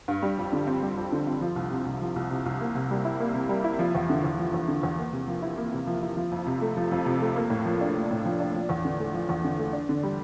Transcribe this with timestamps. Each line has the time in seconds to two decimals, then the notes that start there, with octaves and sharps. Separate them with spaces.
0.08 G2
0.22 G3
0.38 F2
0.53 D3
0.67 C4
0.82 G3
0.97 F2
1.12 D3
1.27 C4
1.41 F3
1.56 C2
1.71 C3
1.86 C2
2.01 F3
2.16 C2
2.31 C3
2.46 C2
2.61 A#3
2.75 C3
2.91 G3
3.05 E4
3.20 A#3
3.34 C3
3.49 G3
3.64 E4
3.79 F3
3.95 E2
4.10 D3
4.24 E2
4.39 F3
4.54 E2
4.68 D3
4.83 E2
4.98 A#3
5.13 C3
5.28 F3
5.42 E4
5.58 A#3
5.72 C3
5.87 F3
6.03 E4
6.17 F3
6.32 F2
6.47 C3
6.62 A3
6.77 F3
6.91 F2
7.06 C3
7.21 A3
7.36 A#3
7.50 A2
7.65 F3
7.81 D4
7.95 A#3
8.11 A2
8.25 F3
8.40 D4
8.54 F3
8.69 E2
8.85 D3
9.00 A3
9.14 F3
9.29 E2
9.44 D3
9.59 A3
9.73 D4
9.89 D3
10.03 G3